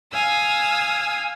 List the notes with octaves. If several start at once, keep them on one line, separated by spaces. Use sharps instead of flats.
F5 G#5 D#6 E6